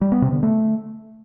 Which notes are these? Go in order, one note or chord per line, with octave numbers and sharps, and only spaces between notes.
G3
B3
C3
D3
A3